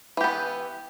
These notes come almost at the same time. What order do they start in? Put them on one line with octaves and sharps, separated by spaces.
E3 G4 B3